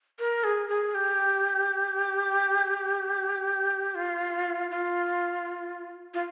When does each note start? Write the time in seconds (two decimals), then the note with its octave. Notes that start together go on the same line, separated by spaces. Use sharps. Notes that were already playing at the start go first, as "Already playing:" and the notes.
0.19 A#4
0.44 G#4
0.69 G#4
0.95 G4
3.95 F4
4.71 F4
6.14 F4